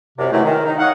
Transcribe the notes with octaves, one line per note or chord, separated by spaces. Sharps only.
C2 F#2 C3
D#3 E3 F#3 G#3 A3 E4
D#3
D#4
C#5 D#5 F5 F#5